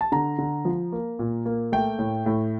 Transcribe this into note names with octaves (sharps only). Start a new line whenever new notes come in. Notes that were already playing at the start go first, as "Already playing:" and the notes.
A5
D3 A#5
D3
F3
A#3
A#2
A#3
A3 G5
A2
A2